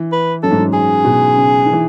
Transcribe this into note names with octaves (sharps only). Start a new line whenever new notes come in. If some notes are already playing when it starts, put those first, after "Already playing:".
Already playing: E3
B4
F#2 A4
G#2
F#2
G#4
B2
C#3
D#3
E3